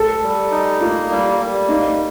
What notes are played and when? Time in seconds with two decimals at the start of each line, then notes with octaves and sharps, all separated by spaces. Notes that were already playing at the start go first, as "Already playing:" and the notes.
Already playing: A4
0.23 G3
0.51 D#4
0.81 A#3 F4
1.11 G3
1.40 G3
1.69 A#3 D#4